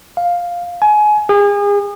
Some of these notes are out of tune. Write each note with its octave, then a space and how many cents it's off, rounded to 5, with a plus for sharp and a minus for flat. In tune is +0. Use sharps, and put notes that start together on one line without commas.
F5 +5
G#5 +25
G#4 -35